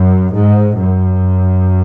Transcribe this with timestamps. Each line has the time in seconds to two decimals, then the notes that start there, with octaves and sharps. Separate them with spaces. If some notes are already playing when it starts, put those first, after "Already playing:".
Already playing: F#2
0.34 G#2
0.78 F#2